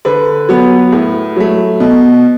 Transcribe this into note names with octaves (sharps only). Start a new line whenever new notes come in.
D3 B4
F#3 B3
A2
F#3 A3
B2